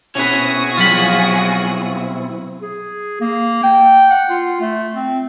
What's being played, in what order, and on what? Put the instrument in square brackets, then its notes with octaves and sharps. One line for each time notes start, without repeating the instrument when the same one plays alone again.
[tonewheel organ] B2 C4 E4 [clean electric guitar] C#4 B4 [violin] F#4 G#4
[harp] F#3 G3 [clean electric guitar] F4 B5
[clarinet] G#4
A#3
G5
F#5
F4
A3
C4